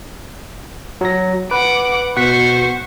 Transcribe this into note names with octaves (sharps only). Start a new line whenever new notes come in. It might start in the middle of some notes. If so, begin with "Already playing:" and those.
F#3 A#6
B4 F#5 D6
B2 C5 F#5 C#6 B6